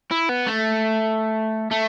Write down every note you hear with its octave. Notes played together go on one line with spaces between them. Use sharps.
E4
B3
A3
A3